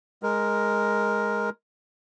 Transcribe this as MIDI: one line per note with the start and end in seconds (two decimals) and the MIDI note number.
0.23 1.50 56
0.23 1.50 70